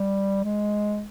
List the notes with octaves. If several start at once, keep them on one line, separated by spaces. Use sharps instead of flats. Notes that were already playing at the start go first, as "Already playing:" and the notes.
Already playing: G3
G#3